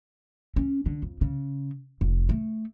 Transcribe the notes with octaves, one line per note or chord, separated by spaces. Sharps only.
C#4
D3
F2
C#3
F1
A3